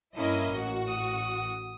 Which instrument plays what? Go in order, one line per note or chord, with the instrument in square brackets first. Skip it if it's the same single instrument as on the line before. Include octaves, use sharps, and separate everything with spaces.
[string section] G2 E4 D#5 [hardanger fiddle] A#3 C#4
[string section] A1 F#4
[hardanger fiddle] D#6